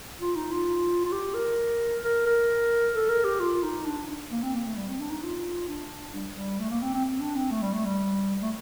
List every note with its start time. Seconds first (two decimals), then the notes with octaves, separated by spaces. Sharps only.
0.21 F4
0.36 D#4
0.51 F4
1.05 F4
1.12 G4
1.34 A#4
2.03 A#4
2.26 A#4
2.95 A4
3.09 A#4
3.24 G4
3.40 F4
3.63 D#4
3.86 D4
4.32 A#3
4.43 C4
4.54 A#3
4.65 A3
4.77 G3
4.88 C4
5.00 D4
5.11 D#4
5.23 F4
5.68 D4
6.14 G3
6.30 G3
6.59 A3
6.71 A#3
6.82 C4
6.94 C4
7.05 C4
7.20 D4
7.36 C4
7.51 A3
7.62 G3
7.73 A3
7.85 G3
8.42 A3